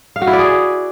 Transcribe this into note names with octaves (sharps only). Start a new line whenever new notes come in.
F5
F#4
E4
D5
G#4